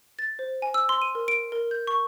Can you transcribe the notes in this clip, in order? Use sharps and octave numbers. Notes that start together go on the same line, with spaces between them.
A6
C5
G#5
E6
C6
D#7
A#4
D7
A#4
G6
C#6